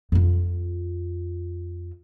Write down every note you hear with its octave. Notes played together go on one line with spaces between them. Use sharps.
F2 F4